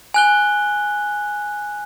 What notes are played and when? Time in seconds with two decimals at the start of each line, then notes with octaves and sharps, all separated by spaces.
0.14 G#5 F#6 G7